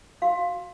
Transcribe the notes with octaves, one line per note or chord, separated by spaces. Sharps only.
F#4 F5